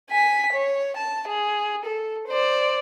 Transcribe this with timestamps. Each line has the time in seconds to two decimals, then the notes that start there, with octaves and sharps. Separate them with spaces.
0.10 G#5 B6
0.53 C#5
0.97 A5
1.29 G#4
1.85 A4
2.28 C5 D5